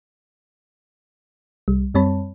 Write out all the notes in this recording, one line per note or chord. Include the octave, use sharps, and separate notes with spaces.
C2 G3
F#2 G3 C4 C#5 A5 B5